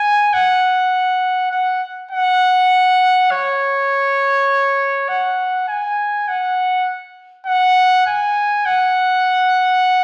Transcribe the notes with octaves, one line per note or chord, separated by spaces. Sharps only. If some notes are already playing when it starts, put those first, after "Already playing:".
Already playing: G#5
F#5
F#5
F#5
C#5
F#5
G#5
F#5
F#5
G#5
F#5